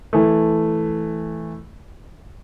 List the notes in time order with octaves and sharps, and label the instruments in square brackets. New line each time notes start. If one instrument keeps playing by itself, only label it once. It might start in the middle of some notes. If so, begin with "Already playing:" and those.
[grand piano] E3 A3